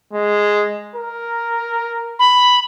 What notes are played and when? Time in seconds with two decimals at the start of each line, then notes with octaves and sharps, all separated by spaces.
0.13 G#3
0.95 A#4
2.19 B5